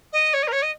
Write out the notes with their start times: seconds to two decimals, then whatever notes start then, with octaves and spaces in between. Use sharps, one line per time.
0.12 D#5
0.33 C#5
0.42 D#5
0.47 A#4
0.52 C#5
0.62 D#5